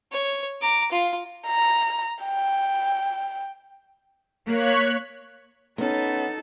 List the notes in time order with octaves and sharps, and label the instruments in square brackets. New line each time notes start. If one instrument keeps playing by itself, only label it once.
[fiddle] C#5
A#5 D6
F4 F5
[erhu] A#5
G5
[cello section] A#3 [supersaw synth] C#5 F#6 B6
[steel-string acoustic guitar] B3 C#4 [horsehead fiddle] D#4 A4